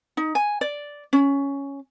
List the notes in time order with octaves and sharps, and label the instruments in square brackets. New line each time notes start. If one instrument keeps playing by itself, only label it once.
[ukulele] D#4
G#5
D5
C#4